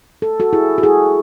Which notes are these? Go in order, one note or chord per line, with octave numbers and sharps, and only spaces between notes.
A4
F#4 A4
E4 G#4
F#4
E4 G#4